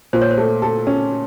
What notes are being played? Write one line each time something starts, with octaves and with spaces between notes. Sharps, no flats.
A#2 C5
C#5
C5
A3
A4
C#4